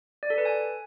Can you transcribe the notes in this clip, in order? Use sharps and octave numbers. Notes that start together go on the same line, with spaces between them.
D5
A4
B4
G#5